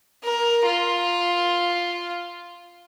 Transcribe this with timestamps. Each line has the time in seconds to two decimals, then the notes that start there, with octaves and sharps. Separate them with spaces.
0.24 A#4
0.66 F4